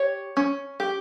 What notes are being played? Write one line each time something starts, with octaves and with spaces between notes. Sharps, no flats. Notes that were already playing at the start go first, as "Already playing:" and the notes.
Already playing: G4 C#5
C#4
G4